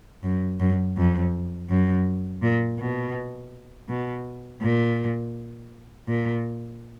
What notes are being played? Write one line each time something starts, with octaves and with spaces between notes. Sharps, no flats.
F#2
F#2
F2
F#2
A#2
B2
B2
A#2
A#2